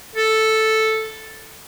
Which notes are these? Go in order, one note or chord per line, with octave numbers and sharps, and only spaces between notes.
A4